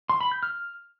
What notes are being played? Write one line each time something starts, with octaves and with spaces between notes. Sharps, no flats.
C6
B5
G6
F6